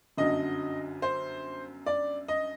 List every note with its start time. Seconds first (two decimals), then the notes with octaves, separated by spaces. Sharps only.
0.17 G1 F#2 D3 F#3 D#5
1.02 C5
1.86 D5
2.28 D#5